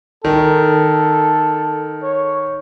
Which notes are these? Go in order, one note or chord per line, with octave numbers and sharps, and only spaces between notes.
D#3 A4
C#5